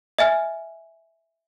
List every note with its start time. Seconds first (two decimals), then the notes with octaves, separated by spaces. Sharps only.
0.18 D#5 E5 G#5 F6